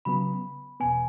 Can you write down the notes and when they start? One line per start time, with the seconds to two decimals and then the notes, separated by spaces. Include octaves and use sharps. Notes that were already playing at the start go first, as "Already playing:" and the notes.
0.05 C#3 F#3 B3 B5
0.80 E2 B2 B3 G#5